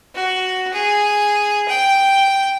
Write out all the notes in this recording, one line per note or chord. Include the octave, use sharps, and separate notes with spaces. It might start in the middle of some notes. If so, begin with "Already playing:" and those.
F#4
G#4
G5